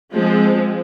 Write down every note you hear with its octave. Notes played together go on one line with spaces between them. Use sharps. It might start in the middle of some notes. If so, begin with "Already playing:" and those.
F3 G#3 C4